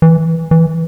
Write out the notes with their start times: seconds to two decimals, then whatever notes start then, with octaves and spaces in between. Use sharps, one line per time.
0.02 E3
0.51 E3